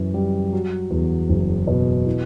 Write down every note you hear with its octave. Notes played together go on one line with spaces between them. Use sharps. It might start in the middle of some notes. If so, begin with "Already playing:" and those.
Already playing: F#2 E3
G3
F#3
E2
F#1
B2
E4